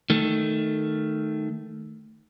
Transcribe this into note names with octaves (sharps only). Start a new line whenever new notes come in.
D#3 A3